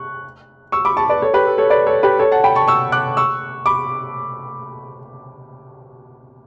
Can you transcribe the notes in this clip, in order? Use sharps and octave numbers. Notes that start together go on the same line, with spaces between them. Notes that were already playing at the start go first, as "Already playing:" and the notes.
Already playing: C#6 F#6
C#6 E6
B5 D6
A5 C#6
B4 D5
A4 C#5
G4 B4
A4
A4 C#5
B4 D5
A4 C#5
G4 B4
A4 C#5
F#5 A5
G5 B5
A5 C#6
C#6 E6
D6 F#6
C#6 E6
B5 D6